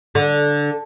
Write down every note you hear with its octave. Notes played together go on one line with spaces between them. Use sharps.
D3